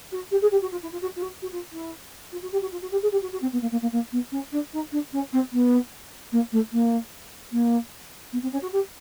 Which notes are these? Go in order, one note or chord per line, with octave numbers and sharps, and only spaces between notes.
F#4
G4
G#4
G4
F#4
F4
E4
F4
F#4
F4
F#4
F#4
F4
E4
F4
F#4
G4
F#4
F4
F#4
G4
G#4
G4
F#4
F#4
C4
B3
A#3
A#3
A#3
A#3
B3
C#4
D4
D#4
D4
C#4
C4
B3
A#3
A3
A#3
A#3
B3
C4
C#4
F#4
G4